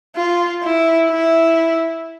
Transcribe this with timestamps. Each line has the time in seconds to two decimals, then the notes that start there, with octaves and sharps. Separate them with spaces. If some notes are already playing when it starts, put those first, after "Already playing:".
0.16 F4
0.63 E4
1.10 E4